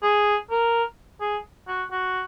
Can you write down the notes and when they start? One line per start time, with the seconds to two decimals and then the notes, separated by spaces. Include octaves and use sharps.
0.03 G#4
0.50 A#4
1.21 G#4
1.67 F#4
1.91 F#4